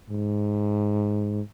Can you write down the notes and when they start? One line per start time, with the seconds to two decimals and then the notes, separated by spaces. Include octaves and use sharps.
0.10 G#2